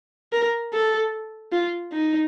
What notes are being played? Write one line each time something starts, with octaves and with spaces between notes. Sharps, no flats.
A#4
A4
F4
D#4